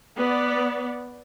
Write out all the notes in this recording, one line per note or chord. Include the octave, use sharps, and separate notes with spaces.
B3 D5